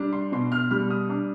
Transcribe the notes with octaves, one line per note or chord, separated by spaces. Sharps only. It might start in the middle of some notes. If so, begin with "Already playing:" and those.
Already playing: G3 D4
C6
B2 C6
F6
G3 F6
D#6
D4